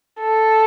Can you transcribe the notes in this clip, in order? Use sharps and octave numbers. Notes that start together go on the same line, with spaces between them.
A4